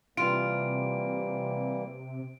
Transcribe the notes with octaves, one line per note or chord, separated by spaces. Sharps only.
C3 E3 G3 A#3 F4 D7